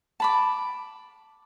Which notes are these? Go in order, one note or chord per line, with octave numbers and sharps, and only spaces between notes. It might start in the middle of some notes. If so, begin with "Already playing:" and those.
A5 B5 D6